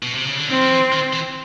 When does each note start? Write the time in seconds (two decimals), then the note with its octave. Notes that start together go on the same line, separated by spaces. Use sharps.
0.03 B2
0.14 C3
0.26 C#3
0.38 D3
0.50 D#3 C4
0.61 F3
0.71 E3
0.92 D#3
1.13 E3